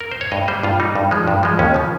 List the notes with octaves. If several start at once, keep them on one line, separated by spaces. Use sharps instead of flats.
A#4
C5
C#5
G2 D#5
G3 C5
G2 F4
G3 D#4
G2
F3 G#3
G2
F3 G#3
D#2 C#4
C#3 F3